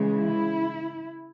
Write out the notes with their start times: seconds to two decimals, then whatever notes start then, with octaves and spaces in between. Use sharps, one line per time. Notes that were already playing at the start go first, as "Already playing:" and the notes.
Already playing: C#3 E3 G#3
0.17 E4